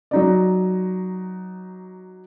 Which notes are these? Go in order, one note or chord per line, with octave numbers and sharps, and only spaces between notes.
F#3 D#4 D5